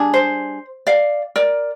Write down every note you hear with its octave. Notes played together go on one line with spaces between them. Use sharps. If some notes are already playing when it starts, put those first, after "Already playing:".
Already playing: G3 D4 G#4
C5
D5 F5
A#4 D5